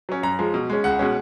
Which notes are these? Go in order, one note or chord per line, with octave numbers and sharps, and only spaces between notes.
F#3 C#4
F#2 A#5
F3 G#3
B2
G#3 C#4
C#2 F#5
B2 G#3 C#4